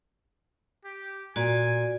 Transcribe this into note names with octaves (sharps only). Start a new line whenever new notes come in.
G4
A#2 F#4 D5 G#5